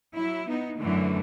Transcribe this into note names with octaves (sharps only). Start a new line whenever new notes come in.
F#3 E4
B3 D#4
F#2 D3 E3 A3